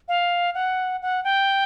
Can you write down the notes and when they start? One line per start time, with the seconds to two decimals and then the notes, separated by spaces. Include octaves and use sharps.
0.08 F5
0.54 F#5
1.02 F#5
1.24 G5